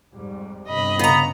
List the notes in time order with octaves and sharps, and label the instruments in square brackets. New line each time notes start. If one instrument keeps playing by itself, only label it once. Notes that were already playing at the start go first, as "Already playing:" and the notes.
[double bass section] F2 G#2 G3
[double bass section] G1 C3 [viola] D#5 B5
[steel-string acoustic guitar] C#3 A#5 [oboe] B3